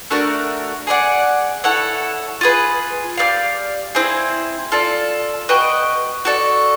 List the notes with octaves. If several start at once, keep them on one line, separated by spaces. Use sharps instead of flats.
A3 D4 F#4 A#4
G#4 B4 D5 F#5
E4 A4 C#5 F#5
F4 G#4 B4
G4 A#4 D5 F5
C4 E4 G#4
F4 A4 D5
F#4 B4 D#5 G5
F#4 A4 D5